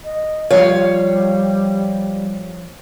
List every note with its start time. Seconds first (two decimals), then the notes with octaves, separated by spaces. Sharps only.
0.04 D#5
0.50 F3 G3 C#5 F5